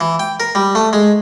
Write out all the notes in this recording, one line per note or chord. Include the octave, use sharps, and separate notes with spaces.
E3
G5
A#4
G3
A3
G#3